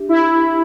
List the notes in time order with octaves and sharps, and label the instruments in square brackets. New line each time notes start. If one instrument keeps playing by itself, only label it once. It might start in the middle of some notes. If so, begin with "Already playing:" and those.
Already playing: [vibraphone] D4 G4 E5
[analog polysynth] E4